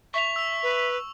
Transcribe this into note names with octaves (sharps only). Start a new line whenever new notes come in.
E5 C#6 F7
E6 F7
B4